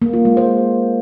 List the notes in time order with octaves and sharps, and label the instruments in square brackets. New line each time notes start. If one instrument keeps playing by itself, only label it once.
[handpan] A#3
F4
G#3
C5